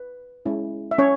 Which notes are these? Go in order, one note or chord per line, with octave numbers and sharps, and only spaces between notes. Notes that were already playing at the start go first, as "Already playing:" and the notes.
Already playing: B4
G#3 C#4 E4
E5
C#4 C#5